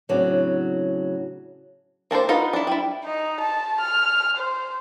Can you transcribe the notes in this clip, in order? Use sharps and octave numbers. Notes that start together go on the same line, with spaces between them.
A2 C#3 F#3 C4 D4
A#3 D4 A4 C5
D#4 F4 B4 F5 F#5
D4 E4
G3 E4
D#4
A5
F6
C5